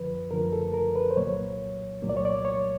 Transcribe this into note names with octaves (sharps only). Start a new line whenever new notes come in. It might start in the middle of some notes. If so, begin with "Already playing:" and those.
Already playing: F#2 D3 F3 B4
F#2 D3 F3 A#4
A4
A#4
B4
C5
C2 A#2 F#3 A#3 C#5
C2 A#2 F#3 A#3
D5
C#5
D5
C#5